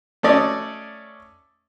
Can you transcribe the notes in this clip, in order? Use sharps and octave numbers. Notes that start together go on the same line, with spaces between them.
A3 C#4 D5 D#5